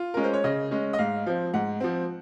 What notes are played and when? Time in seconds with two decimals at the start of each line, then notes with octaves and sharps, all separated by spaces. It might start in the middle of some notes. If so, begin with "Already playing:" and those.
Already playing: F4
0.14 G#3 C#4 A#4
0.24 C5
0.33 C#5
0.44 C#3 D#5
0.71 G#3 C#4
0.93 D#5
0.98 G#2 F5
1.26 F3 C4
1.54 G#2 F#5
1.80 F3 C4